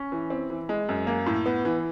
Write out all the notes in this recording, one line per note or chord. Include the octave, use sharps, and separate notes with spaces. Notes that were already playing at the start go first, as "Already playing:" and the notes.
Already playing: C#4
E3
C4
E3
G#3
F#2
A#3
A2
B3
E3